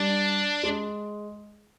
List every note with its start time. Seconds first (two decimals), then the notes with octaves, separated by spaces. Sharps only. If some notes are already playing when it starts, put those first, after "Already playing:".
Already playing: G3 D4
0.63 G#3